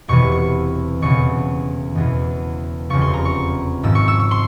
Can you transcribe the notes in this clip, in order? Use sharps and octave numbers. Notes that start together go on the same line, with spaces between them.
E1 E2 C3 E3 C#6
C#6
E1 E2 C#3 E3 C#6
E1 E2 E3
F1 E2 C#3 F3 C#6
C6
A#5
C#6
G#1 G#2 F3 E6
C#6
E6
C#6
C6